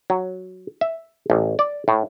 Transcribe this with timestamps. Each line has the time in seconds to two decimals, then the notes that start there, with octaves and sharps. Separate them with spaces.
0.10 F#3
0.81 E5
1.30 A1
1.59 D5
1.88 A2